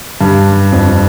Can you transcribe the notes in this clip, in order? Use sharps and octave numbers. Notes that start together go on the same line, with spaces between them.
G2
F2